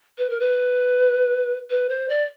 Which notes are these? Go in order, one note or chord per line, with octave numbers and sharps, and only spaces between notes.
B4
A#4
B4
B4
C5
D5